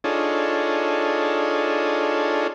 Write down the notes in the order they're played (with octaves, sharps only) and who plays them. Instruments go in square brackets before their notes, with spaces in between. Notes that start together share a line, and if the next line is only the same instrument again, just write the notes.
[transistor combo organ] D4 D#4 F4 G#4 A4 C#5